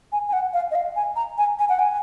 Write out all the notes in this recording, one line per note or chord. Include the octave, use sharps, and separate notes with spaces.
G#5
G#5
F#5
F5
D#5
F5
G#5
A#5
G#5
G#5
F#5
G#5